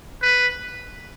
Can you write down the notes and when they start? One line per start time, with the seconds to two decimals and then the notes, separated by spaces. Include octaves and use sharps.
0.22 B4